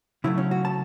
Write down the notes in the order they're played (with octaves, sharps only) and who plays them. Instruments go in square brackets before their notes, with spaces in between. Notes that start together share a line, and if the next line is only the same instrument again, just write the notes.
[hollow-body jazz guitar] C#3 F#3 A3 E4
C#4
F#4
A5